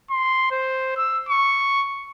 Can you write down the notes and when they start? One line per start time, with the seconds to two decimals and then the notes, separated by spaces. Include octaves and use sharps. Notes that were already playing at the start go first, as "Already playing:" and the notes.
0.11 C6
0.51 C5
0.97 E6
1.29 C#6